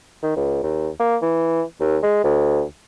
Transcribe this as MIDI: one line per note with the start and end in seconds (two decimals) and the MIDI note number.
0.23 0.33 51
0.36 0.62 37
0.63 0.89 39
1.00 1.16 58
1.22 1.62 52
1.80 1.98 39
2.03 2.21 56
2.24 2.62 38